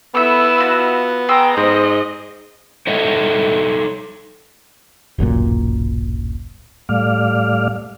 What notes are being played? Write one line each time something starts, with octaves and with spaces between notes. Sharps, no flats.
B3 E4 A4 E5 E6
F4 F#4 A5
G#4 G5 A#5 C6 E6
G#2 C5 D#5
D#4 A4 C#5 D#5 E5
D1 A1 F#2 A#2
A2 G3 A3 D5 F5 F6